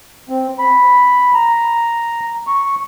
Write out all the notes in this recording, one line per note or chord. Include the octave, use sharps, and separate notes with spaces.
C4
B5
A#5
C#6